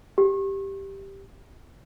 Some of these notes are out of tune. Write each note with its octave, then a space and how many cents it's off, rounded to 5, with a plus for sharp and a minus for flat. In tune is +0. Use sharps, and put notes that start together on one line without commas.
G4 +0